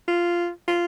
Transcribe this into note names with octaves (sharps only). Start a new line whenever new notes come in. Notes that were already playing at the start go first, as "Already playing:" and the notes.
F4
F4